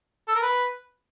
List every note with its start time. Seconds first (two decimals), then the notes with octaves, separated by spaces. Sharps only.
0.28 A4
0.35 A#4
0.42 B4